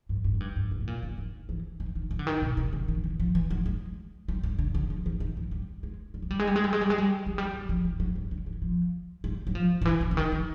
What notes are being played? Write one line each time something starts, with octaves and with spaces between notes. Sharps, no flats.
G2
G2
G#2
G2
G2
A2
B2
A#2
D3
D#3
E3
D#3
D#3
E3
D3
D#3
B2
C3
D3
D#3
E3
F3
E3
F#3
G#3
G3
G3
D3
D3
F3
D#3
D#3
E3
G3
G#3
G3
G#3
G3
G#3
G3
G#3
G3
G#3
G3
G#3
G3
F#3
G3
F#3
F3
E3
F#3
G3
D3
E3
F3
G3
F#3
F3
D#3
E3
E3
D3
D#3
D#3